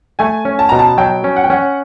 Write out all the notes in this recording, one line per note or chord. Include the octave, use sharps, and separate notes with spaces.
A3 G#5
C#4
A5
B2 A#5
A5
F#3 G5
C#4
F#5
G5
C#4 F#5